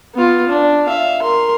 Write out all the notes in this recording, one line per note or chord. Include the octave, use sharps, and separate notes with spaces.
B3 F4
D4
E5 F5
A#4 C6